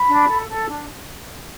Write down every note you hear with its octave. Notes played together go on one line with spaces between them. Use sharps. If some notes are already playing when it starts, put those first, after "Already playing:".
Already playing: B5
D4
A4
A4
D4